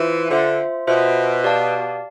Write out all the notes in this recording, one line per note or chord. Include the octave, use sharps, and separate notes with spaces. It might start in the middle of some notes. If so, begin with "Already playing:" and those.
Already playing: E3 F4 C5 E5
D3 F4 C5 E5
B2 F4 C5 E5
G4 D5 F5 A5